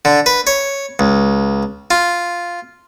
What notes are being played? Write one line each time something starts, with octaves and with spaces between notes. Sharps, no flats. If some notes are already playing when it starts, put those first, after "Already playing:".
D3
B4
C#5
C#2
F4